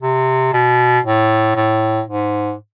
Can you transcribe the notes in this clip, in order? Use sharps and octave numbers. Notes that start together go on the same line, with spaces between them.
C3
B2
A2
A2
G#2